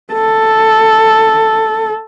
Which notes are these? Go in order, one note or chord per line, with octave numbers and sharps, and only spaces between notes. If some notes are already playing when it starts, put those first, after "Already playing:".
A4